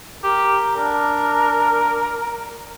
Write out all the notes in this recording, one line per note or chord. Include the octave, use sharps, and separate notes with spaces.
G4 A#4
D4 A#4